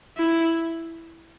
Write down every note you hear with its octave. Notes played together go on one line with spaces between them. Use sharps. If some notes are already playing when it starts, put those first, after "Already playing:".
E4